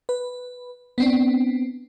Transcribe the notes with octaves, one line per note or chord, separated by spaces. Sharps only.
B4
B3 C4 D4